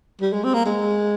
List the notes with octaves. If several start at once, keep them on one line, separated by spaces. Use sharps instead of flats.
G3
G#3
C4
A#3
G#3